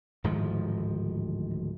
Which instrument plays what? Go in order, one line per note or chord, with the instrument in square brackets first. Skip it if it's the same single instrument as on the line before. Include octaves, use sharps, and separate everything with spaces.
[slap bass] D1 G#2 D#3 F3